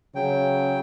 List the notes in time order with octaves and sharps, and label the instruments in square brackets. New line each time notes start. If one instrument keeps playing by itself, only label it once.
[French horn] C#3 [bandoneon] F#3 G5